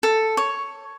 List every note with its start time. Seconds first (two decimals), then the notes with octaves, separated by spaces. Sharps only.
0.03 A4
0.37 C#5